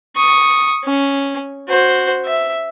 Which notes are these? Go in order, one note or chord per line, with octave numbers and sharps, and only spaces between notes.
C#6 D#6
C#4
F#4 C5
E5